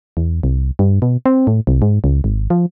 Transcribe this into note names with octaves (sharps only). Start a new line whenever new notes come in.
E2
C2
G2
B2
C4
A2
C2
G#2
C#2
G#1
F3